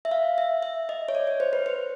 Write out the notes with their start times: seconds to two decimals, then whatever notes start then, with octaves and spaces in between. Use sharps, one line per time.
0.05 E5
0.11 F5
0.38 E5
0.63 E5
0.89 D#5
1.08 C#5
1.15 D5
1.27 C#5
1.40 C5
1.53 B4
1.66 C5